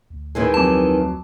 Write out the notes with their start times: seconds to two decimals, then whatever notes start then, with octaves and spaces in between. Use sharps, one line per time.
0.10 D2
0.35 D#3 E3 G#3
0.54 F2 F#3 A5 D6